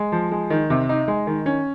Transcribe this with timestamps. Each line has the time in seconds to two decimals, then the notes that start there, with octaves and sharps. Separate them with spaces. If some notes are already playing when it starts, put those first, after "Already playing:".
Already playing: G#3
0.12 F3
0.31 G#3
0.50 D#3
0.70 C3
0.89 D#4
1.08 G#3
1.27 D#3
1.46 C#4